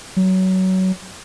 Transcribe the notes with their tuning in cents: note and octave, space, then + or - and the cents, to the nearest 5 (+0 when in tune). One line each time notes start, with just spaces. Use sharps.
F#3 +20